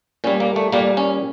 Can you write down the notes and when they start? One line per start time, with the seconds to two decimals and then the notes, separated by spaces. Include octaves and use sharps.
0.24 A#2 G3 C#4
0.40 A#3
0.56 A3
0.72 A#2 G3 A#3
0.97 C#4